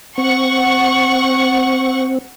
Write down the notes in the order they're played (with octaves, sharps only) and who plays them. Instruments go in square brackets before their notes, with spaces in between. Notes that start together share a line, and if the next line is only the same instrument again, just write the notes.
[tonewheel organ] C4 [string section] F#5 C#6